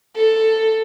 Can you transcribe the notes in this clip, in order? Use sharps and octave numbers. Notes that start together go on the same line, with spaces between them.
A4